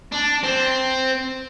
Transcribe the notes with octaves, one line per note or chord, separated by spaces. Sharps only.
D4
C4